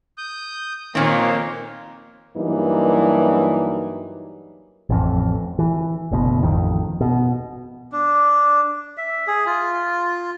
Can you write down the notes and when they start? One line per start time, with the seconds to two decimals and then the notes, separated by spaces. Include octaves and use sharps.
0.18 D#6 G6
0.95 A#2 D#3 A#3 C4 F4 C#5
2.36 G2 E3 F#3 A#3 D#4
4.89 A1 F2
5.59 E3
6.11 F#1 D2 B2
6.43 A1 F2 D#3
7.01 B2
7.92 D4
8.97 E5
9.27 G#4
9.46 F4